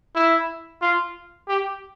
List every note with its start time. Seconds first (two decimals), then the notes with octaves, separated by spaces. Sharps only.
0.15 E4
0.81 F4
1.48 G4